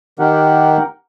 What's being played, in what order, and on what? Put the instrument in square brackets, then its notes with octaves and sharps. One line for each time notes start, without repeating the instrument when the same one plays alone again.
[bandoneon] D#3 [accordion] G4 A#4 F#5